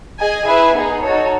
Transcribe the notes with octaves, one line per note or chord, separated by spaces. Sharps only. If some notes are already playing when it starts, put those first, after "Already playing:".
G#4 D#5 G#5
E4 G#4 B4 E5 G#5
B3 D#4 G#4 B4
D#4 F#4 A4 C#5